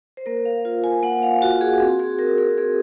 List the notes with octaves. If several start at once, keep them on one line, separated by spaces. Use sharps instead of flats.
C5
A#3 A#4
F5
F4
G#5
A#3 F#5
F5
F4 F#4
G#4
C4 F#4
G#4
F#4 A#4
G#4
C4 G#4